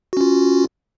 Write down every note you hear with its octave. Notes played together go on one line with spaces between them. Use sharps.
C#4 F4 F#4